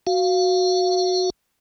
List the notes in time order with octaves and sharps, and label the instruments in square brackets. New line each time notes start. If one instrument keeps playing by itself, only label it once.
[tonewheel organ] F#4 F5